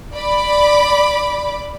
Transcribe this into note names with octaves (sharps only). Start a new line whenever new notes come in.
D5 B5 D6